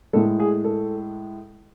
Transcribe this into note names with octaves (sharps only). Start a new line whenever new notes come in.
A2 G#3 A4
G#4
A4